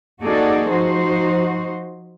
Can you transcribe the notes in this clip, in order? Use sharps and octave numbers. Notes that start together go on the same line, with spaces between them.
A#3 D#4 F#4 G#4 A4 D5
F3 D#4 F#4 C5